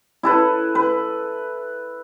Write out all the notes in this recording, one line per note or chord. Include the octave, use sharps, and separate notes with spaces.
E4 A4 B4
B4